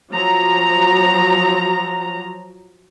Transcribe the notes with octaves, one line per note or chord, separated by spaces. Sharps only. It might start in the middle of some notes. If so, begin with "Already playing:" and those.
F3 F#3 A#5